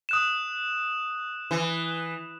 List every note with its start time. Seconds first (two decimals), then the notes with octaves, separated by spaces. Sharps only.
0.09 D#6 F#6 E7
1.51 E3